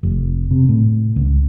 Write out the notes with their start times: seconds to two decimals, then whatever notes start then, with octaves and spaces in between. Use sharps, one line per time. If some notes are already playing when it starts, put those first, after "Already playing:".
0.03 F1
0.51 C3
0.69 A2
1.16 C#2